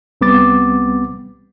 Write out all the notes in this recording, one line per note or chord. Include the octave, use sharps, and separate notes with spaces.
C2 G3 B3 C4 D6 A6